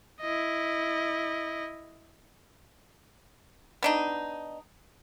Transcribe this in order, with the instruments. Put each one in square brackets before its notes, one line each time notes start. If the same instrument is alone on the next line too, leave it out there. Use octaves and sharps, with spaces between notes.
[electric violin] E4 D#5
[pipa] B3 D4 D#4